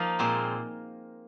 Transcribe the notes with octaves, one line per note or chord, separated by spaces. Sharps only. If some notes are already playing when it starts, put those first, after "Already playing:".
Already playing: F3 A#3 D#4 F5
A#2 G#3 C4